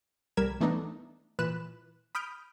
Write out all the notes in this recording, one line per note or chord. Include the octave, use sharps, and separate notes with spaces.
C2 G3 A#4 G#6 B6 E7
E3 A3 B3 D4 D#4
A#2 E3 B4 F#6 E7
B5 D#6 F6 G6 D7